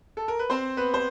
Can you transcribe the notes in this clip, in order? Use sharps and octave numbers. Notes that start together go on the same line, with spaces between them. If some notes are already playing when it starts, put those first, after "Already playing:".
A4
A#4
B4
C4 C5
B3 B4
C5